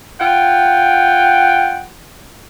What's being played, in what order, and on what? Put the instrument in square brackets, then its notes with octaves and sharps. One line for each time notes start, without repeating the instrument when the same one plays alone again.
[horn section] F4 F#5 G5